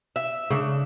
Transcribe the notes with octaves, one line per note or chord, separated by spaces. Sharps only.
E5
C#3 D4